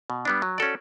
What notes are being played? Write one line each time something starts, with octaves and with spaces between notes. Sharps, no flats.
B2
G3 B3 D4
F#3
C#4 F#4 A4 D5